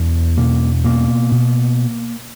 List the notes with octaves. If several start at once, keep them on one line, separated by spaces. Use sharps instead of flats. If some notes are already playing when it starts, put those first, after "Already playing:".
Already playing: E2 B2
B2 A#3
B2 A#3
B2